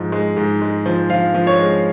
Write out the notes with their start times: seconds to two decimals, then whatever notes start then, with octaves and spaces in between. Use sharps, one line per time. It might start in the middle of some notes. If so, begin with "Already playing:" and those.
Already playing: G#2 F3
0.12 G#3
0.37 G#2
0.62 G#3
0.86 F3
1.10 F3 F5
1.34 F3
1.47 C#5
1.59 G#3